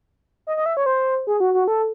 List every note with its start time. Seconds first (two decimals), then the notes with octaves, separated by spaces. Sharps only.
0.47 D#5
0.57 D#5
0.66 E5
0.77 C#5
0.86 C5
1.27 G#4
1.40 F#4
1.54 F#4
1.68 A4